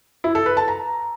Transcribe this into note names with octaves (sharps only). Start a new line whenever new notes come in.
E4
A4
B4
A5
A#5